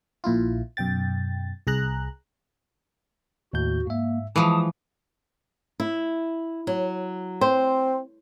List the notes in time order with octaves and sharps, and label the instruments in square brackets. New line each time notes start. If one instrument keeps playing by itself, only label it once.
[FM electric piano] A#1 A#2 E4 F4
F#2 B2 G5 A6
C2 G#4 A#5 F#6
[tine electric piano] D#2 A2 G6 [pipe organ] F#4
[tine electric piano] G#2 E5 [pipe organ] A#3
[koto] E3 F3 [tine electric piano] G#3 [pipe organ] A5 D#6
[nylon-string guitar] E4
F#3
[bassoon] C4 [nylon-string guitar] C5